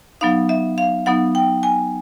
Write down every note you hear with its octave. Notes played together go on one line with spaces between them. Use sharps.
F#3 B3 D#4 F5
E5
F5
F#3 B3 D#4 F#5
G5
G#5